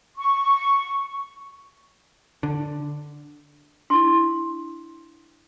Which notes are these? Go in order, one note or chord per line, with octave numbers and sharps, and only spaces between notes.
C#6
D3
D4 E4 C6